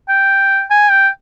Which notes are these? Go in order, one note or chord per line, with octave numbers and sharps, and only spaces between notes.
G5
G#5
G5